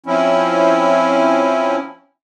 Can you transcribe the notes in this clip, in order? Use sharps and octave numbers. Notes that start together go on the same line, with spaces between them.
F3 C4 C#4 E4